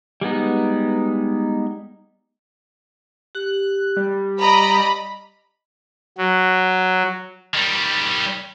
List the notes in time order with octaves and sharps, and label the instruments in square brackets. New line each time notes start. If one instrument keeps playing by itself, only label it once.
[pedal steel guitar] G3 G#3 B3 D#4
[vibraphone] G4 [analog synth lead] F#6
[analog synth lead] G3
[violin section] D5 D#5 A#5 [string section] B5
[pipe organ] F#3
[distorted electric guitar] D#3 G3